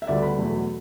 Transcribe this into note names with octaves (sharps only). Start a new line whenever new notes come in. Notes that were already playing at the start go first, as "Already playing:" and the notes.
E5
D2 D3 G3 B3 D5
B5
E2 B2 F#3 A3